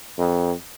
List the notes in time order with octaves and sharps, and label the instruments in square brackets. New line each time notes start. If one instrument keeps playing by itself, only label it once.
[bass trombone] F2